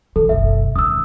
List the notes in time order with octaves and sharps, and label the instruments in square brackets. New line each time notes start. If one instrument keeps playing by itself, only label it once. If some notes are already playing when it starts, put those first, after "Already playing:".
[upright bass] D#3 E3 [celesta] A4
[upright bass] F#1 B1 [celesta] E5
[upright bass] C#2 D#3 [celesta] D#6 E6